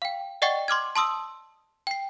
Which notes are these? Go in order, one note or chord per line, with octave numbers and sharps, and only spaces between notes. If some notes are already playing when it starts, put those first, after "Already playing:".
F5 G5
D5 D#5 F#5 G5 C#6 A6
C6 D6 F6 G#6
A5 C6 D#6 E6
G5 C7